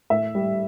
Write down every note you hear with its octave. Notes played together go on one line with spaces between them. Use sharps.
A2 E5
G3